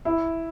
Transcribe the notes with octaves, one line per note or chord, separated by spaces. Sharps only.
E4